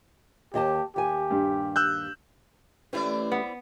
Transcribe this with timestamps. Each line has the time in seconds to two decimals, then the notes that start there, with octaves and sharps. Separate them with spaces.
0.54 D#2 G4 D#5 A5
0.96 D#2 G4 G#5
1.31 G2
1.76 E6 F#6 G6
2.93 E3 A3 C4 C#4 E4 G4 B4 D5
3.32 B3